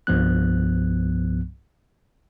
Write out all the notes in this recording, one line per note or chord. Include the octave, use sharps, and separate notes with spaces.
C2 G2 F3 B3 F#6